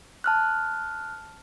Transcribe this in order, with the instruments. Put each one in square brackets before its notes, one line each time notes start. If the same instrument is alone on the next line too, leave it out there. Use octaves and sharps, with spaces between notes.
[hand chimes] A5 F6 F#6